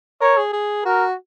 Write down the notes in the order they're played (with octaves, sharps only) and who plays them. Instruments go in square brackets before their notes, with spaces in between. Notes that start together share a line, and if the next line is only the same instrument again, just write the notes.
[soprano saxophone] A#4 [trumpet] C#5
[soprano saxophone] G#4
G#4
[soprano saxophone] F#4 [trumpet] A#4